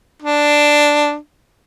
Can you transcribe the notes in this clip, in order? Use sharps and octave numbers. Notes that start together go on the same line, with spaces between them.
D4